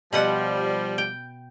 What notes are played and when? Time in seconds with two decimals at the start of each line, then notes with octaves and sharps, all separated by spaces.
0.13 B2 F3 G3 B4 F#5
0.98 G5